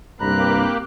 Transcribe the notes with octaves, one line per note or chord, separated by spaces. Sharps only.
C2 G2 A#3 C4 G4 A#5 B5 F#6